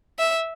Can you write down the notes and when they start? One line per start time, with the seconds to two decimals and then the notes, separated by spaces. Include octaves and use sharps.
0.19 E5